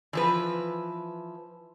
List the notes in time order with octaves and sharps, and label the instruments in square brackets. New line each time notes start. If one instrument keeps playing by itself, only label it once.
[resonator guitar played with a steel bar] E3 F3 B4